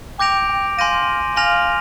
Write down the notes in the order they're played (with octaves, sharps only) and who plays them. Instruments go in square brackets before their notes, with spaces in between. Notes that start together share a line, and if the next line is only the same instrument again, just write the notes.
[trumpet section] G5 [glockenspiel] D6 G6 A#6 D7 F7
[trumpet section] G5
[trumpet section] F5 [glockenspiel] G#5 C6 G6 A#6 D#7
[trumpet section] F5 [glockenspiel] G#5 C6 F6 A#6 F7